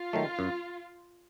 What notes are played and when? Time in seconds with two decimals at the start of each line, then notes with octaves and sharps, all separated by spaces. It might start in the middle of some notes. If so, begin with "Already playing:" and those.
Already playing: F4
0.13 D#3 F#3 A3
0.39 F#2